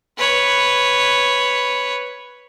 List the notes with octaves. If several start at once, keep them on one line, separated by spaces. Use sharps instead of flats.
B4 C#5